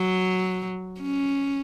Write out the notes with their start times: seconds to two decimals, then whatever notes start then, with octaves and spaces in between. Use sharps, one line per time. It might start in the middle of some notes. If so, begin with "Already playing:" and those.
Already playing: F#3
1.01 C#4